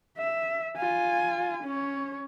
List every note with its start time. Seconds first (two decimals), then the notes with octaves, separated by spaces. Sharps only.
0.18 E5
0.77 F4 G#5
1.63 C#4 C#5